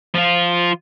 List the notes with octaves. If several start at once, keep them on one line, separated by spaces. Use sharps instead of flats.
F3 F4